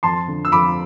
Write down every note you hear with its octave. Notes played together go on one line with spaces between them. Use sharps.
F2 A5 C6
D3
E6
F2 B5 D6